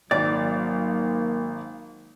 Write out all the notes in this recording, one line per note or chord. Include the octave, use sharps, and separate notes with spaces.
G#1 F#3 A#3 D5